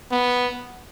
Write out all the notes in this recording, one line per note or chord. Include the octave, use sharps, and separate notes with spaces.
B3